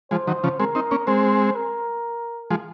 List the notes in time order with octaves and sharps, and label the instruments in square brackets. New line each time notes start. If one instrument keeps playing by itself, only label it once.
[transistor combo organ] F3 G#3 [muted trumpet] C5
[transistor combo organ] D#3 F#3
C#3 F3
[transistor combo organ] G#3 C4 [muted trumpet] A#4
[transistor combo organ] C4 D#4
A#3 C#4
[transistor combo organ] G#3 C4 [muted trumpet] C5
[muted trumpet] A#4
[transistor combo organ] F3 G#3